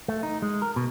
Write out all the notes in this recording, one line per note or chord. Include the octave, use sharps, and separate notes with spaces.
A3
D#4
G#3
A#4
B2